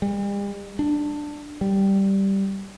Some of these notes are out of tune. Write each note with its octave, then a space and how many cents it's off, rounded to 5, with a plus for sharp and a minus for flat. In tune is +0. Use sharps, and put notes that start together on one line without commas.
G3 +45
D4 +10
G3 -5